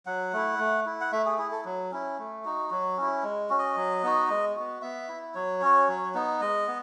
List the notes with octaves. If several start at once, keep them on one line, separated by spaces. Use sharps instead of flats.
F#3 F#5
A3 E4
A3
E4
F#5
A3 E5
G#4
E4 G#4
A4
F#3
C#4 E4
A3
D#4 F#4
F#3 F#4
C#4 E4
G#3
C#4 F#4
D#5
F#3
B3 D#4 F#4
G#3
B3 F#4
B3 E5
E4
F#3 C#5
C#4 F#4
F#3
B3 D#4
G#3 D#5
B3